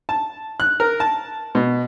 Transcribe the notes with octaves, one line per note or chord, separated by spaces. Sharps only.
A5
F#6
A#4
A5
B2